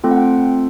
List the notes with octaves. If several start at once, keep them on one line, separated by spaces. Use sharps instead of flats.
A3 C4 F4 A4 G5
F#5
G5